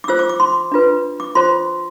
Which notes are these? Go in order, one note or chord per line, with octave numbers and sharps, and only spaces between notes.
D6
F4 C5 E6
D6
D6
C6
D4 F4 B4
D6
F4 C5 C6